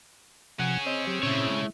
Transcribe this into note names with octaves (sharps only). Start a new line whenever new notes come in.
C3 F3 C#4 G#4 F#5
C4 C#5 D#5
F#3 G4
A#2 C#3 C#4 E4 C#5
G#3